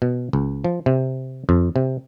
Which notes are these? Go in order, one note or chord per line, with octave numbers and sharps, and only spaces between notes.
B2
C#2
F3
C3
F2
C3